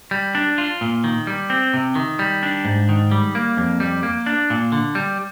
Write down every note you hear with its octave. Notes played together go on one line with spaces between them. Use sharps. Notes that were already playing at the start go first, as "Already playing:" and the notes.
G3
D4
F4
A#2
D#3
G3
C4
C3
D#3
G3
D4
G#2
D#3
G3
A#3
F2
G3
A#3
D4
A#2
D3
G3